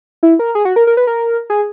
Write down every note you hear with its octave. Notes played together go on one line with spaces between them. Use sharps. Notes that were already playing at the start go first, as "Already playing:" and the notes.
E4
A#4
G#4
F#4
A#4
A#4
B4
A#4
G#4